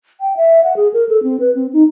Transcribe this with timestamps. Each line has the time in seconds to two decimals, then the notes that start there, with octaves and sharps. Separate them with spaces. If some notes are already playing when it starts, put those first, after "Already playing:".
0.20 G5
0.37 E5
0.64 F#5
0.76 G#4
0.94 A#4
1.09 A4
1.23 C4
1.40 B4
1.55 C4
1.73 D#4